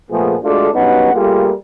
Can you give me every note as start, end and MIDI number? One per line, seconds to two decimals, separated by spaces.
0.11 0.35 46
0.11 0.35 53
0.11 0.35 57
0.11 0.35 59
0.11 0.35 68
0.43 0.69 56
0.43 0.69 57
0.43 0.69 62
0.43 0.69 65
0.43 0.69 66
0.43 0.69 69
0.73 1.10 43
0.73 1.10 54
0.73 1.10 59
0.73 1.10 61
0.73 1.10 63
0.73 1.10 78
1.13 1.51 55
1.13 1.51 57
1.13 1.51 58
1.13 1.51 65
1.13 1.51 68
1.13 1.51 70